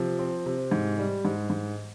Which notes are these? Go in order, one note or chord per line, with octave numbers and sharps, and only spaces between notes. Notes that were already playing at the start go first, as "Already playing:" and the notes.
Already playing: C3 F3
C4
C3
G#2
G3
G#2
G#2